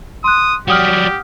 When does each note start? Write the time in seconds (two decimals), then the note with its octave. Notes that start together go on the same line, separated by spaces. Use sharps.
0.24 C6 D#6 F#6
0.68 F#3 G3 G4 F#5 D#6 F6